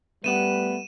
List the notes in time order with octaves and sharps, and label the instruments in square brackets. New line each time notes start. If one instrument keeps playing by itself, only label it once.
[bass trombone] G3 [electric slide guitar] A3 B3 F#5 [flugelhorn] B4 [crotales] D#7 E7